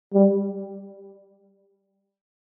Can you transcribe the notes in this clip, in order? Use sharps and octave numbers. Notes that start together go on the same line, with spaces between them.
G3